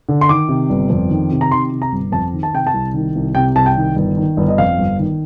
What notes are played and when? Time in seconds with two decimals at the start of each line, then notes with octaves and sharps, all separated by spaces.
0.09 D3
0.21 C6
0.29 D#3 D6
0.49 C3
0.70 G1
0.90 F2
1.10 D#3
1.31 C3
1.41 A#5
1.51 D#3 C6
1.72 C3
1.82 A#5
1.92 G1
2.12 F2 A5
2.33 D#3
2.43 A5
2.53 C3 G5
2.67 A5
2.74 C2
2.94 D#3
3.15 C2
3.35 C3 G5
3.55 C2 A5
3.66 G5
3.76 D#3
3.96 G1
4.16 D#3
4.37 G1
4.48 D#5
4.58 F2 F5
4.78 G1
4.99 D#3